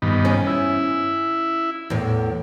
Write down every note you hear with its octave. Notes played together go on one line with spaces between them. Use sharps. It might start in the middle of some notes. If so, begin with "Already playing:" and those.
G2 D#3 B3
C#4
E4
E2 A2